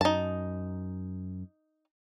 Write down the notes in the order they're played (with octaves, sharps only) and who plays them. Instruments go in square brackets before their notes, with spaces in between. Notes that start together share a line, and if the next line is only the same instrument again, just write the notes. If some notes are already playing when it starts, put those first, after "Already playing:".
[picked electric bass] F#2 [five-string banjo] D#4 A5